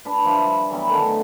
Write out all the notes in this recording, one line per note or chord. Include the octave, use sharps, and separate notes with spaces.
D4 B4
F3 D4 E5 B5
G3
E3 F#3 G3 B3
D3 D#3 A3